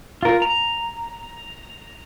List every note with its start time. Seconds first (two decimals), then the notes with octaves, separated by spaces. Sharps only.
0.23 F4 A#4
0.42 A#5